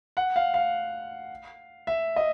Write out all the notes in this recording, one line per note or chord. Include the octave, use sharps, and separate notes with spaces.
F#5
F5
F5
E5
D#5